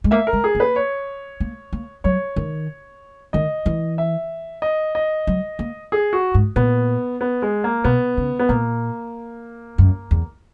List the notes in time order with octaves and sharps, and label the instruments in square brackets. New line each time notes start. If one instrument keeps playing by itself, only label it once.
[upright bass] G#3
[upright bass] A#3 [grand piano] E5
[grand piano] A#4
[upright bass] G#3
[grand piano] G#4
[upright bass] A#3
[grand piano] B4
C#5
[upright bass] A#3
A#3
[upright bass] F#3 [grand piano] C#5
[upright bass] D#3
[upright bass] D#3 [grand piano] D#5
[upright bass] E3
[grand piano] E5
D#5
D#5
[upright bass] F#3
A#3
[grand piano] G#4
F#4
[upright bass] G#2
[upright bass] A#2 [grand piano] B3
[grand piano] B3
G#3
A#3
[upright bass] B2 [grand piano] B3
[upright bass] C#3
[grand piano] B3
[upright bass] A#2 [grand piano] A#3
[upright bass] F#2
E2